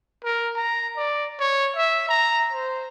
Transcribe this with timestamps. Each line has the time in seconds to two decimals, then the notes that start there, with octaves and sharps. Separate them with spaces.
0.24 A#4
0.55 A#5
0.97 D5
1.40 C#5
1.76 E5
2.09 A#5
2.52 C5